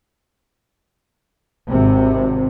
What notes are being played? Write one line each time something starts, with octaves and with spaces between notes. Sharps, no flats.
G#1 C3